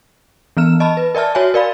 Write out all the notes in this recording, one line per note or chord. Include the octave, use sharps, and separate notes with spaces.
E3 B3 F6 E7
D#5 A5 B5
B4
A#4 D5 E5 A5 F6
F#4 C#5 E5 G#5
A#4 D5 F5 B5